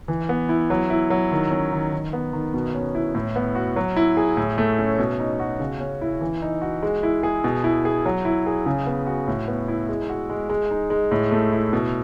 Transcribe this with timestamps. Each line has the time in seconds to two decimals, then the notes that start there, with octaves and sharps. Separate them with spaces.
0.08 E3
0.29 B3
0.49 E4
0.70 F#3
0.90 E4
1.10 F#3
1.32 D#3
1.51 C#4
1.73 D#3
1.92 D#3
2.13 B3
2.33 D#3
2.54 B2
2.74 C#4
2.95 E4
3.15 A2
3.36 B3
3.55 F#4
3.76 F#3
3.96 E4
4.17 G#4
4.37 A2
4.58 A3
4.79 C#4
4.99 B2
5.19 D#4
5.40 F#4
5.60 C#3
5.80 C#4
6.01 E4
6.21 E3
6.42 D#4
6.61 F#4
6.83 G#3
7.03 E4
7.23 G#4
7.44 B2
7.64 E4
7.85 G#4
8.05 F#3
8.25 E4
8.46 G#4
8.66 C#3
8.86 B3
9.06 F#4
9.27 A2
9.48 B3
9.68 E4
9.89 G#3
10.09 F#4
10.29 G#3
10.49 G#3
10.71 D#4
10.90 G#3
11.11 A2
11.31 A3
11.52 E4
11.73 B2